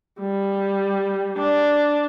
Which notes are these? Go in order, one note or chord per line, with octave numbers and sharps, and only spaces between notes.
G3
D4